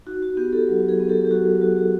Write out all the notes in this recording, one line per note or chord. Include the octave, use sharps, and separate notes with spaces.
D#4 F#4
F#4
B3 G4
G4 A4
F#3
G#4 A#4
B3
G4 A4
G4
F#3 F#4 G#4
G4
F#3 F#4
G4